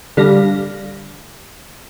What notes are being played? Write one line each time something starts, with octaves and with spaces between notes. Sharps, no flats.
D3 G3 F5 A#6